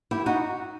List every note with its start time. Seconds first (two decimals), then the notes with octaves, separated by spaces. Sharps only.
0.11 E4 G4
0.26 D#4 F#4